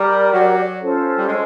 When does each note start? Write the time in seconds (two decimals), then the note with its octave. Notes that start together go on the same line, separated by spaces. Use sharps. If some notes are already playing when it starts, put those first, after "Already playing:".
Already playing: G3 G4 A#4 D5
0.33 F#3
0.81 C#4 F4 A4 C5
1.18 G3
1.28 G#3